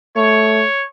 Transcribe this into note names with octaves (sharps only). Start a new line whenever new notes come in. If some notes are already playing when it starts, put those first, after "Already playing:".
A3 C#5